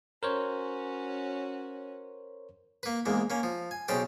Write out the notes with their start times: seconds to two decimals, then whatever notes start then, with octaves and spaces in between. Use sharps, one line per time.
0.23 C#4 F#4 A#4 C5 C#5
2.83 A#3 B4
3.06 E2 G#2 A#3
3.30 A#3 C#4
3.43 F3
3.71 G#5
3.88 B1 C#3 C#4 C5 D5 G5